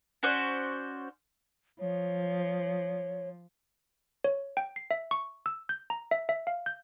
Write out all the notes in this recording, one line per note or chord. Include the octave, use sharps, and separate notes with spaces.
C#4 F#4 C5 D5
F3 C#5
C#5
G5
C7
E5
C#6
E6
G6
A#5
E5
E5
F5
G6